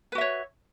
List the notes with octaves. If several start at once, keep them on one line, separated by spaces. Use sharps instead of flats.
F#4 B4 C#5 E5